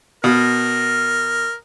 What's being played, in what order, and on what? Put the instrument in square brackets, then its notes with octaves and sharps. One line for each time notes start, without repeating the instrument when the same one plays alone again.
[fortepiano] B2 [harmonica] A#4